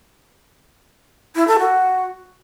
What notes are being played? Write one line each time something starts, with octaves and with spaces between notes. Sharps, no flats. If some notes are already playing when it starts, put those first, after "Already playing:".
E4
A4
F#4